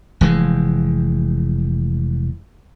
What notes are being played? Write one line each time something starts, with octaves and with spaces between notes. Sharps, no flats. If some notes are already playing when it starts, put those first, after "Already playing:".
F1 E3 G#3